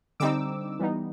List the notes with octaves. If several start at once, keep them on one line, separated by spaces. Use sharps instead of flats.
D3 G3 C4 D#4 D6 E6
E3 G3 B3 D#4